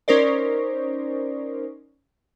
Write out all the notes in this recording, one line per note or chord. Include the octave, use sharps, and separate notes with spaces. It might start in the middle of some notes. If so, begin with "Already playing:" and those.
C#4 D#4 A#4 C5 D5